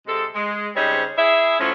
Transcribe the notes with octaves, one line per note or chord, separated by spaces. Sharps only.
C3 G#3 A4
G#3
C#3 G3 C4 D#4 C5 C#5
E4 G#4 E5
A2 F3 F#3 C#4